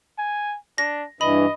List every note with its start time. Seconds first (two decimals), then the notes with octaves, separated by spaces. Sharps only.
0.18 G#5
0.78 D4 A#6
1.21 G2 E3 D#5 B5